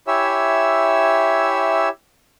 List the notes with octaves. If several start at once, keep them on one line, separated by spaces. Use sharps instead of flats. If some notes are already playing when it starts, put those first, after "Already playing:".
E4 G4 C#5 E5 G#5 E6